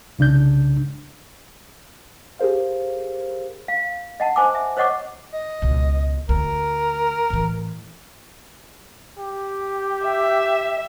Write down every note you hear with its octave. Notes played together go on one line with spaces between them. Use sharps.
C2 C#3 D4 G6
G4 G#4 A#4 C5 F5
F5
D#5 F#5 A5
C5 G#5 D6
E5
C5 C#5 D#5 F#5 C#6 D6
D#5
C#2 B2
D2 A#4
A2 E3
G4
E5